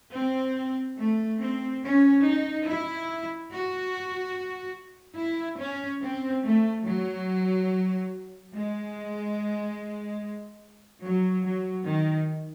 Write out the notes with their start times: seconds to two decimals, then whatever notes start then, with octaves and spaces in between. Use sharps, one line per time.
0.16 C4
1.00 A3
1.41 C4
1.84 C#4
2.25 D#4
2.67 E4
3.50 F#4
5.18 E4
5.59 C#4
6.02 C4
6.43 A3
6.84 F#3
8.51 G#3
11.03 F#3
11.45 F#3
11.86 D#3